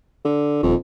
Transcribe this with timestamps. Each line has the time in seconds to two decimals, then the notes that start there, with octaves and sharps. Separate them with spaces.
0.25 D3
0.63 D#1 F2